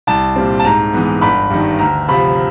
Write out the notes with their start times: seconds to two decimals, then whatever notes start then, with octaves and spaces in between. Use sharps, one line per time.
0.07 C2 A5
0.35 A#2 G3 C4
0.60 A5
0.64 G#2 A#5
0.93 E3 G#3 B3
1.21 G1 B5
1.50 G2 D#3
1.79 D2 A#5
2.08 C3 F3 B5